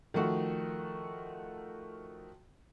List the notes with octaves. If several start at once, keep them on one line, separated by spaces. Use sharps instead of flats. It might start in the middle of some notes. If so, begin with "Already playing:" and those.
D#3 F3 A3 F#4